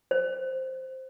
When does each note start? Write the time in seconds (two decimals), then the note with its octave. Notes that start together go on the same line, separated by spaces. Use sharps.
0.11 C5